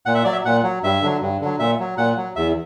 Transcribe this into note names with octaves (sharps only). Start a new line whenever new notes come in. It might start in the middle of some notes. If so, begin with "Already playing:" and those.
A#2 F#5
E5
F#3 D5
E5
A#2 F#5
F#3
G2 E5
D3 F#3
G2
D3 F#3
A#2 E5
F#3
A#2 F#5
F#3
E2 E5